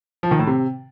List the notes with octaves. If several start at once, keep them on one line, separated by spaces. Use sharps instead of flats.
F3
D#3
A2
C3